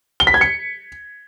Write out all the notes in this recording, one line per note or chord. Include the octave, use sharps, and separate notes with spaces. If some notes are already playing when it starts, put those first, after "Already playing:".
G7
B6
G#6
C#7